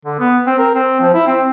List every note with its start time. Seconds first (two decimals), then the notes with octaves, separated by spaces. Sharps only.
0.05 D3
0.19 B3
0.47 C4
0.58 A#4
0.75 C4
1.00 F3
1.14 E4
1.27 C4